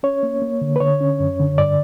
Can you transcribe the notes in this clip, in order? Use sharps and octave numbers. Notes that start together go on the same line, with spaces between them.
C#4 C#5
A#3
A#3
D3
B4
D3 C#5
C#4
F#2
D3
G2 D5